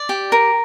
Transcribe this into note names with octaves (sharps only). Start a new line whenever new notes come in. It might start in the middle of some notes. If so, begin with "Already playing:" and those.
Already playing: D5
G4
A#4